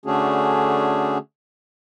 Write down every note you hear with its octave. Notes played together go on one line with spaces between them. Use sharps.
D3 A3 C#4 D4 F#4 G#4